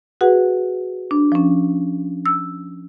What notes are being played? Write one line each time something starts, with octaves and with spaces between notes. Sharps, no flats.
F#4 G#4 B4 F#5
D4
F3 C#4
E6